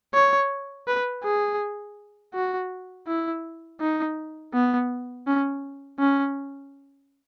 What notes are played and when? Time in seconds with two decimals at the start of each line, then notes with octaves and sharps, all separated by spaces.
0.14 C#5
0.87 B4
1.23 G#4
2.34 F#4
3.07 E4
3.80 D#4
4.54 B3
5.27 C#4
5.99 C#4